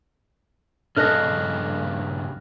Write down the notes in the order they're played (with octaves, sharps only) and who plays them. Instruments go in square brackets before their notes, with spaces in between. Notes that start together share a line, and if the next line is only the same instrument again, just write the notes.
[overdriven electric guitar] G2 C#3 [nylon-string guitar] D4 A4 D#5 [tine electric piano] F6 F#6 A#6